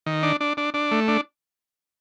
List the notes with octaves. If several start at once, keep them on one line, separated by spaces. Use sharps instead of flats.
D#3
D4
D4
D4
D4
A3
D4